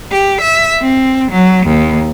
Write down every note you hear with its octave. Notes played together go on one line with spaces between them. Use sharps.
G4
E5
C4
F#3
D#2